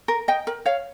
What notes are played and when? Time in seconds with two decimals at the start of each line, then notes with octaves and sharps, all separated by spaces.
0.08 A#4
0.28 D#5 G5
0.47 A#4
0.66 C#5 F5